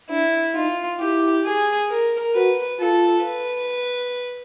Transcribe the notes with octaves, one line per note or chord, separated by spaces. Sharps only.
D4 E4
D#4 F4
E4 G4
G#4
A#4
F#4 B4
F4 A4
B4